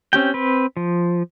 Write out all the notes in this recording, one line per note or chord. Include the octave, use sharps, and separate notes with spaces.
C4 C#4 G4 G5
C4 B4
F3